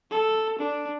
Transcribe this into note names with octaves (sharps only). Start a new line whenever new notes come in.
A4
D4